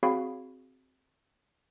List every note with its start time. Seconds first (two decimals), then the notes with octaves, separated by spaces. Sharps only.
0.03 C4 F#4 G#4 C#5 F5 B5